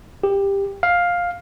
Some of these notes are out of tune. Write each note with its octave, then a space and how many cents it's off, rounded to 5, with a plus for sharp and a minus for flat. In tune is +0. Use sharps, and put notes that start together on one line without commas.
G4 +15
F5 +10